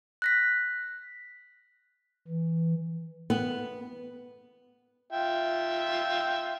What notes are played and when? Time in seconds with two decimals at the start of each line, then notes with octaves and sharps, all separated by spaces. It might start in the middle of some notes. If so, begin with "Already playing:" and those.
0.22 F#6 A#6 B6
2.28 E3
3.30 B3
5.11 F4 E5 G5